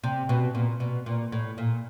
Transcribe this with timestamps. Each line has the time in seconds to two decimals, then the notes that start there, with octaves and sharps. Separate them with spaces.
0.04 C3
0.29 B2
0.55 A#2
0.80 B2
1.06 A#2
1.32 A2
1.58 A#2